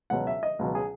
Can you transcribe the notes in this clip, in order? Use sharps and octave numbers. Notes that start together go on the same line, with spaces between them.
C#2 B2 F#3 F#5
E5
D#5
C#2 B2 F#3
G#4